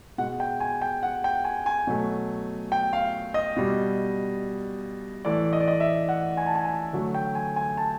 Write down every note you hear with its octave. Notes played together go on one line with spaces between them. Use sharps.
B2 G#3 F#5
G5
G#5
G5
F#5
G5
G#5
G#5
B2 F#3 A3
G5
F5
D#5
B2 G3
A2 E3 A3 D5
D#5
D5
D#5
E5
F#5
G#5
A5
G#5
A5
D3 F#3 A3
G5
G#5
G#5
A5